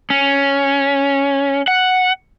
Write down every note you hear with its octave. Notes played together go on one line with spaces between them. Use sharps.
C#4
F#5